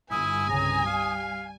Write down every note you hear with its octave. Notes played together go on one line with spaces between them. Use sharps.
G1 E4 G#5 D#6
C2 G2 C#3 A#5
G3 F5